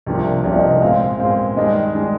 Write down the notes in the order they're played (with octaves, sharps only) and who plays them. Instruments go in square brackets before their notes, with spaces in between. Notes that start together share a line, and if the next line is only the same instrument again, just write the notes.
[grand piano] C2 C3 F3 A#3 D4
[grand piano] C2 C3 F3 A#3 D4 [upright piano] D5
[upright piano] D#5
D#5
[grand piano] A#2 G#3 C4 [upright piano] F5
[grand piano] A#2 G#3 C4 [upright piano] F5
[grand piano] G2 D#3 G#3 D4 [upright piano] D#5
[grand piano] D#3 G#3 D4